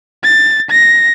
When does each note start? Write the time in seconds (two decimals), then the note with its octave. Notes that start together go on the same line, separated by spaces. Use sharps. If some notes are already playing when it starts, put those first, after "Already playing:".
0.24 A6
0.70 A#6